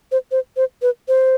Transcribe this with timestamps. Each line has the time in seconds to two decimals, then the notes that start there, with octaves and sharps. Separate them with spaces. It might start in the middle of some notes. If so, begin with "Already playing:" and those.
0.12 C5
0.31 C5
0.56 C5
0.82 B4
1.08 C5